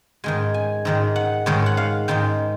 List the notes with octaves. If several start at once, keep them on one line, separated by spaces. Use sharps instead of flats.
G#2 D#3 G#3 G#5
G#5
G#2 D#3 G#3
F#5
G#2 D#3 G#3 C#5
F#5
F5
G#2 D#3 G#3 G5